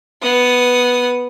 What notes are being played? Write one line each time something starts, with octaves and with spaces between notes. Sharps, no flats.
B3 D#6